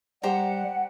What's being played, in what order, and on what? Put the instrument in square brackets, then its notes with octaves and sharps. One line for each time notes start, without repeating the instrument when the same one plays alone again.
[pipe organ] G3 [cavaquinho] G4 C5 A#5 [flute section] F#5